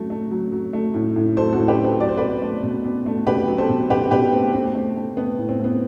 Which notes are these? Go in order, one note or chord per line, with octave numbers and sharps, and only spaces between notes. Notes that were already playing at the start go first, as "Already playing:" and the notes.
Already playing: F#3 A3
A3
F#3
F#3
A3
A2
A2
F#3 A4 C5
A2 F#4 A4
G4 B4
A2
A4 C5
F#3 D5
C5
B2 B4 D5
A3
B2
B2
A3
B2 G4 B4
F#3
A4 C5
B2
B2 G4 B4
B2 G4 B4
A3 C4
A3 C4
A3
A3
A3 B3
A2
C4
A2 B3